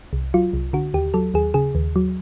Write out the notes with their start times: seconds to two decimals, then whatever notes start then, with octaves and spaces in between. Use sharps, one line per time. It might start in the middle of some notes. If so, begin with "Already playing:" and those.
0.13 C2
0.34 F#3 F4
0.53 C2
0.73 D3 F#4
0.94 D#2 G4
1.14 F#3 A4
1.34 D#2 G#4
1.54 C#3 G#4
1.75 D#2
1.96 F#3